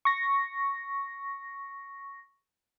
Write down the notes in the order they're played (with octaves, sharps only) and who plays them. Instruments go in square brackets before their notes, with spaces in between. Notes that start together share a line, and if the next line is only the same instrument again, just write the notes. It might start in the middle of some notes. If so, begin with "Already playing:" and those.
[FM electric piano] C#6 A#6